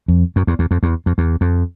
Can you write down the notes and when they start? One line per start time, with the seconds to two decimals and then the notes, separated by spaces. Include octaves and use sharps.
0.08 F2
0.36 F#2
0.47 E2
0.59 E2
0.71 F2
0.83 E2
1.06 F2
1.18 E2
1.41 F2